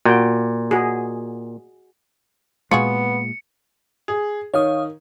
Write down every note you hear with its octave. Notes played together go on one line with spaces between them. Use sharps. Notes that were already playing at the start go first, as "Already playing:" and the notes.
A#2 F#4 G5
F#4 G#4
A#2 G#3 B3 F4 F#4 G#4 C#7
G#4
D#3 C#5 F5 D#6